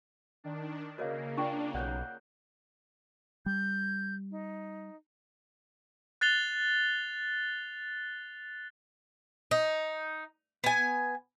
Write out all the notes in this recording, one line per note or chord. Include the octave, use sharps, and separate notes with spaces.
D#3 D4
C#3 A#3 F#4 A#4 C#5 D#5 F5
D4 F4 G5 C#6
B1 C#5 D5 F#5 F#6 G6
G3 G6
D#4
F#6 A6 C7 F7 G7
D#4
B3 G#5